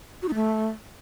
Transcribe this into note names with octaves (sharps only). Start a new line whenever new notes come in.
F#4
D#4
A3